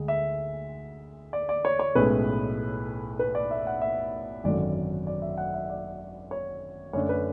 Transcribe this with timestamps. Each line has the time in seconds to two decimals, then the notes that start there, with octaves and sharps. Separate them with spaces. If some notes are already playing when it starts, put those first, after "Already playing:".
Already playing: D2 G#3
0.08 E5
1.33 D5
1.49 D5
1.65 C#5
1.79 C#5
1.95 B1 A2 G#3 C#4 B4
3.19 B4
3.35 D5
3.51 E5
3.67 F#5
3.82 E5
4.44 G#1 F#2 D3 F#3 D5
5.07 D5
5.22 E5
5.38 F#5
5.54 E5
5.70 D5
6.31 C#5
6.93 F#2 D3 A3 D4 C#5
7.09 B4